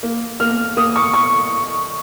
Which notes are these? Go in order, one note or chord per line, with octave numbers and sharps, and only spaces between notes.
A#3
A#3 F6
A#3 D#6
C#6
C#6